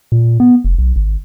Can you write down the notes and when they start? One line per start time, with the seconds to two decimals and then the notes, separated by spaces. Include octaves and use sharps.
0.12 A#2
0.40 B3
0.64 F1
0.78 B1
0.96 G#1